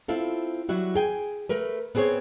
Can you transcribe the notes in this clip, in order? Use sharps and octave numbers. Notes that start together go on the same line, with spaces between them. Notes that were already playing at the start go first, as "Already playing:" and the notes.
C4 E4 F4 A4
F#3 G3 E4 F#4
G#4 G5 G#5
A3 A#4 B4
B3 C4 G#4 C5 C#5